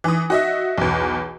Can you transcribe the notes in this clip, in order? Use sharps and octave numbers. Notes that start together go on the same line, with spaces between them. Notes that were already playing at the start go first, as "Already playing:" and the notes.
E3 D#6
F#4 D#5 E5
B1 E2